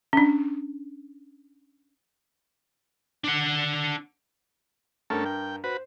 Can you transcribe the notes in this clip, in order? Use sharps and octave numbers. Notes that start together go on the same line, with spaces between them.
C#4 D4
D4 F#5
G2 A3 C#4 A4 A#4
G5
F#4 B4 C5